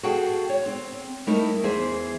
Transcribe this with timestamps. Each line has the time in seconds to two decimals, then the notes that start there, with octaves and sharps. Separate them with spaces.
0.03 F#4 G#4 A4 F5 G5
0.49 C#5
0.66 C4
1.27 G3 A3 D#4 E4 A#4 E5
1.63 E2 E3 G#4 C5 E5